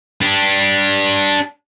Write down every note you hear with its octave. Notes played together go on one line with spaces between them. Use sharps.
D4 G4